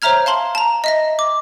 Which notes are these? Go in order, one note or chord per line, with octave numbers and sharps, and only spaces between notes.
C5 C#5 E5 A#5 F6 G#6
F5 A5 C6 F#7
A5 A#5
D#5 E5 A#6
D6